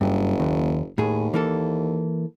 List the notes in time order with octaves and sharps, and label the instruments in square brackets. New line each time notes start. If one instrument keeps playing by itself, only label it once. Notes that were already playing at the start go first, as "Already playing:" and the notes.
[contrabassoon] F#1 [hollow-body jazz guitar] G2
[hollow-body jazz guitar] D#2
[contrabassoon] D#2 [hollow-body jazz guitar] A2 G#4
[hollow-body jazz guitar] E3 A#3 A4